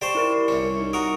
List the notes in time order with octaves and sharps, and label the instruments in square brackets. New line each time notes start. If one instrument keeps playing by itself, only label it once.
[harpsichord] G4 C5 A5 [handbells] D5 C#6
[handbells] E4 A#4 D5
[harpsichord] C2 C#4 [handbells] C#7
[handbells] D#4
[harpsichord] F#4 A#4 [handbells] D#6